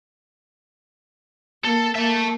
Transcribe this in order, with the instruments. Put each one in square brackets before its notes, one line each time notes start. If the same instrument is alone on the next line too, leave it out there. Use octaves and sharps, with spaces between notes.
[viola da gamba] A#3 [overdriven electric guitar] A4
[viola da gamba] A#3 [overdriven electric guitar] E5 A5